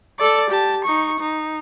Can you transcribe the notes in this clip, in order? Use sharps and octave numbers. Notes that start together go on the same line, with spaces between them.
A4 D5
G4 A5
D#4 C#6
D#4